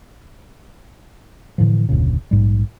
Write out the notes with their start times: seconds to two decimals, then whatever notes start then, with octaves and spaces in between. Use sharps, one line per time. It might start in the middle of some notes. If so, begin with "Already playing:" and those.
1.58 A2 D3 E3 F3
1.89 F1 D2 A#2 C#3
2.31 A#1 G#2 G3